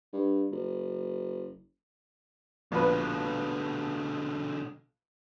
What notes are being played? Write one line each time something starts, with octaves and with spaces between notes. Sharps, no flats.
G2
F#1
A#1 B2 D3 B4